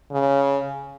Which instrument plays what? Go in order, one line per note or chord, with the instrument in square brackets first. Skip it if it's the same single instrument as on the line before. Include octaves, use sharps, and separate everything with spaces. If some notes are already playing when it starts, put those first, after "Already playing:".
[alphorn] C#3